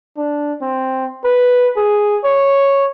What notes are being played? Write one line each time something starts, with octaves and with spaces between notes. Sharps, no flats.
D4
C4
B4
G#4
C#5